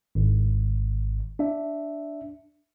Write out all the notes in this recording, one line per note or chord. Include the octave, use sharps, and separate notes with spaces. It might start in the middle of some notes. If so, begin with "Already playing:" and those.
G#1
D4 E5